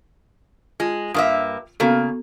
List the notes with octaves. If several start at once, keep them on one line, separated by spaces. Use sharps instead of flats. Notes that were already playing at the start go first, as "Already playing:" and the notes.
G#3 F4
G2 A#3 E5 D#6
C#3 A#3 B3 F#4 A4